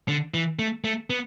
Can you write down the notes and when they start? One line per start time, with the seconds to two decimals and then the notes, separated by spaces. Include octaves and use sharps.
0.08 D3
0.34 E3
0.59 A3
0.84 A3
1.10 B3